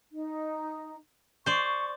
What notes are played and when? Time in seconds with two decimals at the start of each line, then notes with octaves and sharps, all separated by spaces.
0.12 D#4
1.46 C5 D5 C#6